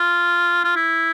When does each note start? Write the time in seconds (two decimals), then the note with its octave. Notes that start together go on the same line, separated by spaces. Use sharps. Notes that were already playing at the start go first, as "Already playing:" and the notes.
Already playing: F4
0.64 F4
0.76 E4